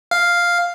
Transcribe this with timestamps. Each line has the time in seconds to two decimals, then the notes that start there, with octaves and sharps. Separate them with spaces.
0.11 F5